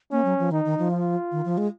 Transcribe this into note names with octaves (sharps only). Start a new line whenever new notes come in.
A#3 C#4
F#3
F3
D#3 D#4
D#3
F3
F4
D#3
F3
G#3